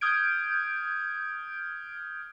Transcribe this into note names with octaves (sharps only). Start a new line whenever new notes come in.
D#6 F6 G6 G#6 D7